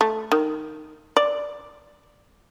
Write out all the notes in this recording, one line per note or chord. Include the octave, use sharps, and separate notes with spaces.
A3
D#3
D5